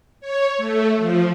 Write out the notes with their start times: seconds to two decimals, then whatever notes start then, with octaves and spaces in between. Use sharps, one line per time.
0.21 C#5
0.58 A3
0.97 F3